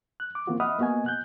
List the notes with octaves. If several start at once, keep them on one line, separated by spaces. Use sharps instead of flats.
F#6
D6
E3 A#3 C4 F4 F#4
D#5 E5 F#5 B5 D#6 F6
A#3 B3 F#4 D#5 G#5
B2 F#6 G6